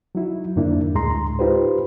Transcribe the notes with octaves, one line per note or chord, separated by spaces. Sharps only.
F#3 D#4 E4
F2 G#2 D3 A#3 D4 E4
D2 A2 G#3 A#5 C6
D#4 F4 G4 B4 C5